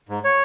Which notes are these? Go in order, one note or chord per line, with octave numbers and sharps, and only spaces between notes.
G#2
C#5